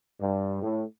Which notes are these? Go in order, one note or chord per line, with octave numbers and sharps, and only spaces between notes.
G2
A2